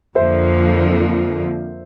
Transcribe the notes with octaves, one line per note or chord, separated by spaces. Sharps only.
F2 D3 F3 A#3 C5 E5